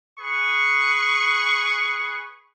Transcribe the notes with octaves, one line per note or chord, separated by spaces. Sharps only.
G#4 B4 C#6